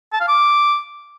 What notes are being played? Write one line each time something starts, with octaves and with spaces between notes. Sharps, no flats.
A5
F5
D6